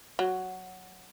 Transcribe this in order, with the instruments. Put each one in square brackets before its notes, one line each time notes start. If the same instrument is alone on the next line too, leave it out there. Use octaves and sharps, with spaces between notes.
[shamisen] F#3